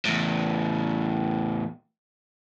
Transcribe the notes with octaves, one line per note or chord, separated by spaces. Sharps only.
E2 A2